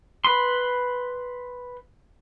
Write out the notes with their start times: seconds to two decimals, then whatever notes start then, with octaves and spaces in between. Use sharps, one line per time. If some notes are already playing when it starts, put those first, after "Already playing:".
0.25 B4 B5 C6